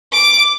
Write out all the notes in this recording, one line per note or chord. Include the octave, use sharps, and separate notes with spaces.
D6